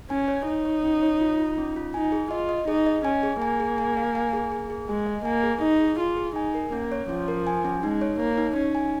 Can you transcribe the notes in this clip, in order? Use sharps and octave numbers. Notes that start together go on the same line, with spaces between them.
C#4 G#5
C#5
D#4 C#5
C#5
C#4
C#5
F4
F4
C#4
F4
D#4 G#5
G#4
F4 D#5
D#5
D#4 G#4
D#5
C#4 G#5
G#4
A#3 G#5
G#4
G#5
F5
G#5
G#4
G#4
G#4
G#3 G#5
D#5
A#3 G#5
G#4
D#4 D#5
G#4
F4 G#4
G#4
D#4 G#5
A#4
A#3 C#4
C#5
F3 C#4
A#4
G#5
C#4
G#3 D#4
C#5
A#3 C#5
D#4
C#4 D#4
G#5